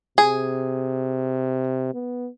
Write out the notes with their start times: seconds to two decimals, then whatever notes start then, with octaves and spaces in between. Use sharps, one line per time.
0.18 C3 G#4
1.94 B3